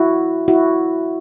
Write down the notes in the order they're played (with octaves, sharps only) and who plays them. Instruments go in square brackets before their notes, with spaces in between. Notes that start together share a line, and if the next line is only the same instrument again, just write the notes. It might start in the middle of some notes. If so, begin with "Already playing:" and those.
Already playing: [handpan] E4 F#4
E4 F#4